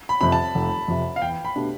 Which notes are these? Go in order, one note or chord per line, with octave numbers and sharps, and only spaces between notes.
B5
F2 C3 B5
A5
F1
F2 C3
F5
E2 G5
B5
B2 A3 D4 G4